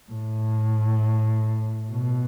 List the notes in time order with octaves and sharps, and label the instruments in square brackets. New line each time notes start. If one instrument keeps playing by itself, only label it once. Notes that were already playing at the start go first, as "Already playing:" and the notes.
[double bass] A2
B2